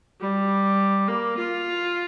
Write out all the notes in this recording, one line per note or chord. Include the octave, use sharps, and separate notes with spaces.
G3
A#3
F4